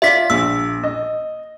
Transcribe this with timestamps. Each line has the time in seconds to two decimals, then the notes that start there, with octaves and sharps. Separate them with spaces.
0.02 F4 D5 E5 B6
0.30 A#1 E6
0.84 D#5